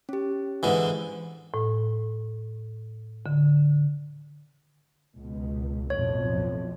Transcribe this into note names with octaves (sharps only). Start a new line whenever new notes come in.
C#4 G4
G#2 D3 E3
A2
D3
C#2 B2
B1 F2 A2 C#5